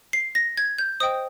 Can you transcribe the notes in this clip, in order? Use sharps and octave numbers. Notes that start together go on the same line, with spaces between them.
C7
A#6
G#6
G6
C5 D#5 G5 D#6